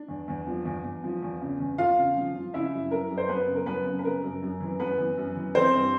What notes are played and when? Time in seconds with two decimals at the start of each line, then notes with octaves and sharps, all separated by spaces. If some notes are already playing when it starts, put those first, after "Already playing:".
Already playing: D4
0.09 E2
0.28 E2
0.47 F3
0.65 E2
0.84 E2
1.04 F3
1.23 E2
1.41 C#3
1.60 E2
1.78 E2 F4 F5
1.98 C#3
2.16 F3
2.35 F3
2.54 C#3 E4 E5
2.73 F#2
2.91 F#2 A#4
3.10 F#2
3.17 C5
3.29 F#2 B3 B4
3.47 C#3
3.55 A#4
3.66 F#2 B3 B4
3.85 C#3
3.99 B4
4.04 C#3 A#4
4.22 F#2
4.42 F#2
4.60 E3
4.80 F#2 B3 B4
4.98 E3
5.17 F#2
5.35 E3
5.55 E3 C4 C5
5.73 G2